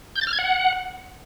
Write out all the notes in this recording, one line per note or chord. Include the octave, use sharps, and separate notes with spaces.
G6
A6
F6
G#6
F#5